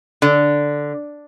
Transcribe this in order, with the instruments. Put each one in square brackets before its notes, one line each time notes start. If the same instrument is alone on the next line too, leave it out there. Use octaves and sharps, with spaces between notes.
[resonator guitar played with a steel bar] D3